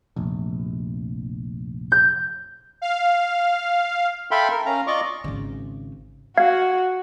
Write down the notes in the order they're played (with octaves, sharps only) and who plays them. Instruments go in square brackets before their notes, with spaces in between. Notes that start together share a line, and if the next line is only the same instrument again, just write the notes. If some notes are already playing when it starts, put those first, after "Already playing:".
[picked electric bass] F1 A#1
[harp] G6
[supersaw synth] F5
[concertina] A4 E5 F5 G5 B5 C6
A#4
C#4 F5 A#5
F4 D5 D#5 C#6 D6
[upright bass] G#1 C#3
[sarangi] F#4 [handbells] F5 G#6